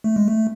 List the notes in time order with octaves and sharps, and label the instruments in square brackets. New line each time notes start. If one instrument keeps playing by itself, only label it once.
[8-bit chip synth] A3
G#3
A3